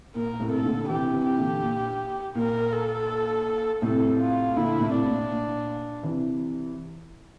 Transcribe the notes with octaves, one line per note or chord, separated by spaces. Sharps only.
A#2 A#4
A2 C3
A4
A#2 D3
C3 E3 G4
C3 E3
G4
A#2 D3
A#2
A#2 A#4
A4
A2 C3 A4
F4
A#2 D3 E4
A2 C3
D4
A#2
A#2
C3 E3